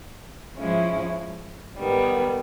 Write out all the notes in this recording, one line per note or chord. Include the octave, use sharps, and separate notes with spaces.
G#2 F3 G#3 C#4 E4
G#2 D#3 G3 B3